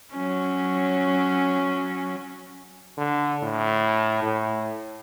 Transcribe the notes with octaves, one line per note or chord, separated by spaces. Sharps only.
F#3 C#4
D3
A2
A2